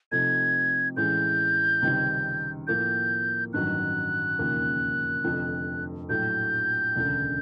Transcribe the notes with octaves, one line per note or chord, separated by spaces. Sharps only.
C3 F3 A3 C4 D#4 G#6
A2 E3 G#3 C#4 G6
C#2 C3 D#3 G3 C4
A2 F3 A#3 G6
A1 G2 D#3 F#3 F#6
E1 D#2 C#3 F3 A#3
F1 F2 D3 F3
A#1 A2 F#3 A3 G6
E1 D2 C#3